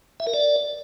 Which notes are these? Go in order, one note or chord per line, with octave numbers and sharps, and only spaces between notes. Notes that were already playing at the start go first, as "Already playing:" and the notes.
E5
A#4
D5